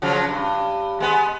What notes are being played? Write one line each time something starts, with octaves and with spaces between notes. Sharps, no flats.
C#3 F3 F#3
G2
G#3 B3